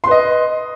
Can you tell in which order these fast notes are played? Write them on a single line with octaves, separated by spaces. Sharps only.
C6 B4 D#5